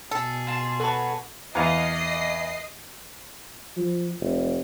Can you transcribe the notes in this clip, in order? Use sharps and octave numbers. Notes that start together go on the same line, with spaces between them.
B2 G#4 A4
F4 A5
F#4 A4 B4 C#5 A5
E2 D#5 F5 C7
F3
F1